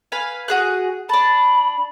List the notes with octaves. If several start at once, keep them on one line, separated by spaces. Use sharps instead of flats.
B4 F5 G#5
F#4 G#4 F#6
D4 A5 B5